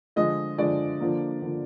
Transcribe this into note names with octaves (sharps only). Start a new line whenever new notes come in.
D3 F3 G#3 D#5
D3 F3 G#3 D5
D3 F3 A#3
D3 F3 A#3